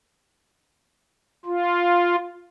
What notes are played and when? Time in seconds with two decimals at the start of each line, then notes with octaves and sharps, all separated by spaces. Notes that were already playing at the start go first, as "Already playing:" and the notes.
1.46 F4